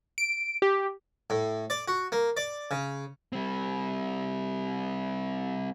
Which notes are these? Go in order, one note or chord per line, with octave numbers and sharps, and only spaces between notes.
D7
G4
A2
D5
F#4
A#3
D5
C#3
G3 C4